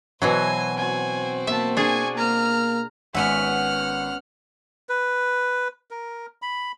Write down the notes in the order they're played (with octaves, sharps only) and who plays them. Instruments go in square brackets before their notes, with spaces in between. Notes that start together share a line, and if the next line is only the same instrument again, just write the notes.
[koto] B2 E3 F#3 [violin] C5 G#5
[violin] C4 F#4 [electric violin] G#5
[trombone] A#3 [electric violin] B3 A5 [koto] E5
[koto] D4 G#4 [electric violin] G#5 C#6
[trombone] A#3 [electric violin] A#5 F6
[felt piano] G#1 [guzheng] B3 C#4 E5 [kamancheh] F#5 F6
[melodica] B4
A#4
B5